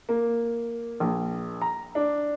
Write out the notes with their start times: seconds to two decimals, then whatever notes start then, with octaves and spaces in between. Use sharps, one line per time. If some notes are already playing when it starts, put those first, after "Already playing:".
0.09 A#3
1.00 A#1
1.62 A#5
1.95 D4